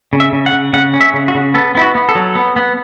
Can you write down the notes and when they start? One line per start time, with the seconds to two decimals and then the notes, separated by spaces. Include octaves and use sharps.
0.13 C#3
0.20 E5
0.33 C#3
0.46 F#5
0.53 C#3
0.73 C#3 F#5
0.94 C#4
1.01 E5
1.14 C#3
1.28 F#4
1.35 C#3
1.54 B3 A4
1.75 B3 E4
1.82 F#4
1.95 B3
2.09 A4
2.15 F#3
2.35 B3
2.56 B3